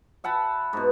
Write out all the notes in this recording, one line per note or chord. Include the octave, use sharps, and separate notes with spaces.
E5 F#5 A5 B5
G#2 B2